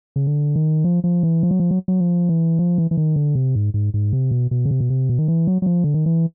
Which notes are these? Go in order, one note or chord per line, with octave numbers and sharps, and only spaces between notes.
C#3
D3
D#3
F3
F3
E3
F3
F#3
F3
F#3
F#3
F3
E3
F3
E3
E3
D#3
D3
C3
G#2
G#2
G#2
C3
B2
B2
C#3
C3
B2
C3
B2
D#3
E3
F#3
F#3
F3
D3
D#3
E3